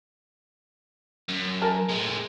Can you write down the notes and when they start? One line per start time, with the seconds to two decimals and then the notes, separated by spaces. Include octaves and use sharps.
1.29 F#2
1.61 A#4 G#5 A5
1.90 A2 G#3